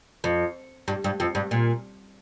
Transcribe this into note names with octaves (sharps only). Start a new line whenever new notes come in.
F2
G2
G2
F2
G2
A#2